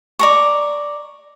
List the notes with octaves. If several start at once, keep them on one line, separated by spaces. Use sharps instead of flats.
D5 A#5 C#6